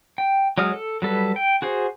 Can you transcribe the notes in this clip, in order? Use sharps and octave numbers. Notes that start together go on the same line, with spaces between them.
G5
F#3 G#3 C#5 D#6 F6
A4
F#3 G3 A4 B4
G5
F#4 G#4 C5